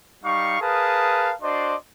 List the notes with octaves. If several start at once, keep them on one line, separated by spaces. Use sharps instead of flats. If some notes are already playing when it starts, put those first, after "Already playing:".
G3 D#4 F5 C#6
G#4 A#4 B4 F5 A5 D#6
D4 F#4 C5 D5 D#5 C6